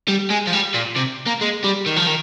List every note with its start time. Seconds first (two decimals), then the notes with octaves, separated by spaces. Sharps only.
0.08 G3
0.30 G#3
0.47 F3
0.53 G3
0.74 A#2
0.97 C3
1.27 A#3
1.42 G#3
1.64 G3
1.86 D#3
1.96 F3
2.07 D#3